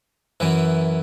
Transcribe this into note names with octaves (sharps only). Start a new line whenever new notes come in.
F#2 E3